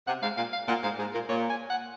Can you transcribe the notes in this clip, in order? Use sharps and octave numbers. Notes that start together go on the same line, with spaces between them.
C3 F#5
G#2 F5
A#2 F5
F5
A#2 F#5
G#2 F5
G#2 G#4
A#2 A#4
A#2 C#5
G#5
F#5